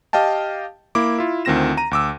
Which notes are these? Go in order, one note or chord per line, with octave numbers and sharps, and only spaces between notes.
G4 D#5 F5 G5 A5
A#3 E4 D6
E4 F4
D2 D#3 C4 F4 A#6 E7
A#5 D#7
D2 D6 E6